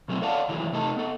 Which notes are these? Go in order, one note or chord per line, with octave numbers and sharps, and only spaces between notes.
B2 F#3 A3 B3 C4 E4
A4 C#5 D5 F5 F#5 A5
D#3 E3 F#3 G#3 A3 E4
C3 A3 D#4 A4 A5
B3 A4